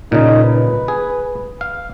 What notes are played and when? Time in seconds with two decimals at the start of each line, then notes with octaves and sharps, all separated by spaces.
0.12 A#2 C#3 D#4
0.44 B4
0.88 G#4
1.61 F5